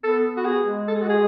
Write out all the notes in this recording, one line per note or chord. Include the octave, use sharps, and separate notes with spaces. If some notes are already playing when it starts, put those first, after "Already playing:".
B3 A4
B3
F#4
G#4
G#3
A4
G#4
F#4
G#4